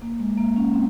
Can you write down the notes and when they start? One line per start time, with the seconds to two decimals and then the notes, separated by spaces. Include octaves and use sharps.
0.02 A#3
0.20 G#3
0.38 A#3
0.56 C#4
0.74 C4